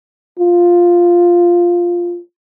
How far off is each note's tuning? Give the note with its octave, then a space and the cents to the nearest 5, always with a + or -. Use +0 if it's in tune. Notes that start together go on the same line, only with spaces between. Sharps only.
F4 +0